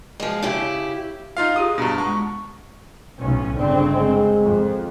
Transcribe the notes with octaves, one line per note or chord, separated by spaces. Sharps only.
F3 G#3
C#3 E4 G4
D#4 F4 F5
F4 G4 G#4 D#6
G2 B2 D4 A#5
G#3 A5 C#6
B1 A2 C#4
G1 C#3 C4 D4
G#3
F2